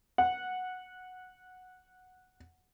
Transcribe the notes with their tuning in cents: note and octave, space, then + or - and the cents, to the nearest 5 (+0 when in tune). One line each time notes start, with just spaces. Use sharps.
F#5 -5